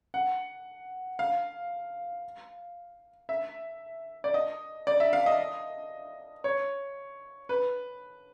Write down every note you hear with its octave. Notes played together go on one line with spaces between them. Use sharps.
F#5
F5
E5
D5
D#5
D5
E5
F5
D#5
C#5
B4